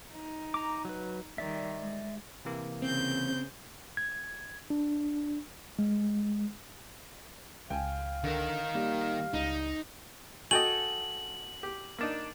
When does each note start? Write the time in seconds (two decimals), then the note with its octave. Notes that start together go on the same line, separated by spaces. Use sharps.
0.11 D#4
0.54 A#5 D6
0.85 F#3 B4
1.38 D#3 G3 D5 E5
1.79 G#3
2.45 C3 E3 A#3
2.82 C#3 C4 G6
3.97 G#6
4.70 D4
5.79 G#3
7.70 C#2 F5 G5 G#5
8.24 D3 D#3 A#4
8.75 G3 A#3
9.33 C#2 D#4
10.51 F#4 A4 D#5 G5 G#5 F#7
11.63 G4
11.98 A#3 D4 D#4